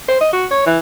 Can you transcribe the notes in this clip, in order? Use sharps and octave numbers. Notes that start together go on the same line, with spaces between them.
C5
D#5
F#4
C#5
E3